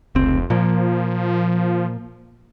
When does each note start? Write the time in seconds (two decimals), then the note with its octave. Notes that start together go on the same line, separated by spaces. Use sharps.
0.15 F1 C#2 C4
0.50 A#2 F3 A#3